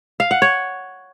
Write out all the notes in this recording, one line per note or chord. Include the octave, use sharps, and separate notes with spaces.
F5
F#5
C#5